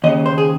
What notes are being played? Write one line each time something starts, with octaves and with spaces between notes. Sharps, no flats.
D#2 C#3 D#5
C5
G#4